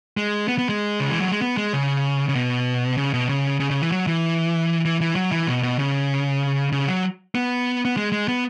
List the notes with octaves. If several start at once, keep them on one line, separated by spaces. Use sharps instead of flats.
G#3
B3
B3
G#3
C#3
E3
F#3
G#3
B3
G#3
C#3
C#3
B2
C#3
B2
C#3
C#3
C#3
E3
F#3
E3
E3
E3
F#3
E3
B2
B2
C#3
C#3
F#3
B3
B3
G#3
G#3
B3